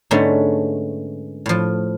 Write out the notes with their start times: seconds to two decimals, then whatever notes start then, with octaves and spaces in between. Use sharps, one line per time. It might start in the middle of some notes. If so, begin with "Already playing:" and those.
0.11 G#2 D3 G#3 A3 B3 C#4
1.46 A2 F3